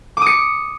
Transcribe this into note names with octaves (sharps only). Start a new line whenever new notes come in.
D6 D#6 C#7